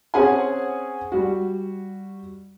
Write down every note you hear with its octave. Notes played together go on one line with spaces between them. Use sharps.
C4 C#4 G#4 F#5 G#5
G3 F#4